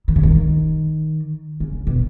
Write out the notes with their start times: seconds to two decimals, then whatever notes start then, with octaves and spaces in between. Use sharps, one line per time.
0.08 D#3
0.16 C#3
0.23 D#3
1.60 C#3
1.87 B2